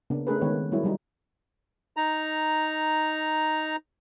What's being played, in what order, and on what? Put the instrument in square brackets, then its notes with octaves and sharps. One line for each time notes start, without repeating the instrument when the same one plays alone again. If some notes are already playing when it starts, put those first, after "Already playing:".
[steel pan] C#3 A#3 B3 D4
A3 C#4 D4 G#4 A#4 B4
D#3 G#3 B3 B4 C#5
C4
F#3 G3 A#3 E4 G#4 C#5
F#3 G3 D#4
[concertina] D#4 A#5